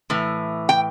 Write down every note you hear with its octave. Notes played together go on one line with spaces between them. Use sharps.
A2 E3
G5